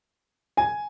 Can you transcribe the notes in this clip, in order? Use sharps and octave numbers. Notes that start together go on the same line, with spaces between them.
G#5